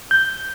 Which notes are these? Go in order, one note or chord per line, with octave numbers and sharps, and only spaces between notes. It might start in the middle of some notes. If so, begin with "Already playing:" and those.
G6